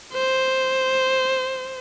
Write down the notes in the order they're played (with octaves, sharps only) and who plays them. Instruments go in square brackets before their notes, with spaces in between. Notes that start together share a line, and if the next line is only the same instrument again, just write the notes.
[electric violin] C5